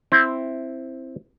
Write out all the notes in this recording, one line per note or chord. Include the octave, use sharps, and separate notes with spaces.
C4 E4